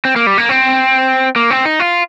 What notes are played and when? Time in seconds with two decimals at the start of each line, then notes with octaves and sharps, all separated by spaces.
0.05 C4
0.16 A#3
0.27 G3
0.38 A#3
0.49 C4
1.36 A#3
1.50 C4
1.65 D#4
1.80 F4